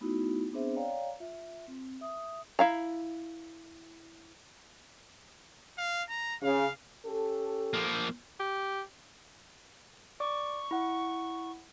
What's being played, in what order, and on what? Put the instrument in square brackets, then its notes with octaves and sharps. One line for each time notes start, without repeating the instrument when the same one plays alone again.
[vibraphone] A3 B3 D#4 E4 F#4
B3 C4 D4 G#4 C5 E5
C#5 D5 F5 G5 A#5
F4 E5
C4
E5 D#6
[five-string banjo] E4 F5 A#5
[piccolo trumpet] F5
A#5
[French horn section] C#3 [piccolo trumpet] F5
[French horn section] C#4 G4 A4
[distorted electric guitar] F3 A#3
[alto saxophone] G4
[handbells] D5 D6 [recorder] C#6
[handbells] E4 F#5